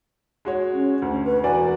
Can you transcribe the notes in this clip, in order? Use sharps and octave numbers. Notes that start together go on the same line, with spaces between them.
G#3 F#4 C#5
C#4
D2
B4
E1 F#4 D5 G#5